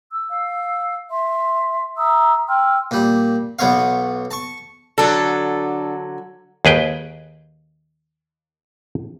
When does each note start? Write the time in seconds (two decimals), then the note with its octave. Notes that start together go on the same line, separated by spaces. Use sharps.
0.12 E6
0.30 F5 E6
1.11 E5 C6
1.96 E5 A#5 D#6 E6
2.48 G5 C6 E6 F6
2.91 A#2 G3
3.59 B1 B3 C#5 F5
4.31 A5 C#6
4.98 D3 F#3 D4 A4
6.65 D#2 G#4 B4 G5